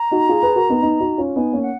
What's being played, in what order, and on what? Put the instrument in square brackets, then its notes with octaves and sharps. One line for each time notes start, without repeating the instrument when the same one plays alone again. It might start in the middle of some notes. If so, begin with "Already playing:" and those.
Already playing: [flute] A#5
[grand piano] D#4 F#4
F4 G#4
G#4 B4
F#4 A#4
B3 D#4
B3 D#4
D#4 F#4
C#4 F4
[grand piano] B3 D#4 [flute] G#5
[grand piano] A#3 C#4
[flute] F#5